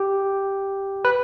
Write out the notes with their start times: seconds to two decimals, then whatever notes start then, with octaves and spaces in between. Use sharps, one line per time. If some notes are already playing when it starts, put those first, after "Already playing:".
Already playing: G4
1.05 B4